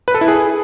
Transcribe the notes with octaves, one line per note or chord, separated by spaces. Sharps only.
B4
A4
E4
G#4